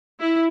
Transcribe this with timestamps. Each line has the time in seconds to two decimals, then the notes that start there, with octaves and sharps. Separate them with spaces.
0.21 E4